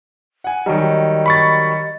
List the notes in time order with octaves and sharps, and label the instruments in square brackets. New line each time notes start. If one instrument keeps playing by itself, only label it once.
[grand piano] F#5 G#5
[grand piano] D#3 F#3 G3 [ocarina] D#5
[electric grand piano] B5 C#6 A6